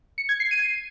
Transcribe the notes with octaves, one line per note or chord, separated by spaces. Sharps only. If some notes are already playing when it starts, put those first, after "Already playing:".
C#7
G#6
C7
D#7